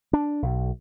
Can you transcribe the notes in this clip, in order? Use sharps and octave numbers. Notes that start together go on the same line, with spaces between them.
D4
B1